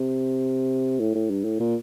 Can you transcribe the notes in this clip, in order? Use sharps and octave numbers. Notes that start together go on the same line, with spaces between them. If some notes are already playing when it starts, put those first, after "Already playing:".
Already playing: C3
A2
A2
G2
A2
A#2